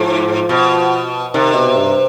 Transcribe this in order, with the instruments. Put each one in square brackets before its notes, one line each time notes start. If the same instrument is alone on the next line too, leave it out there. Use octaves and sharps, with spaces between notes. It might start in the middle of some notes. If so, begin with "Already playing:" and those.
Already playing: [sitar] G#2 [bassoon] F3
[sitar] B2
[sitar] C3 [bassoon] D#3
[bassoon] B2
G2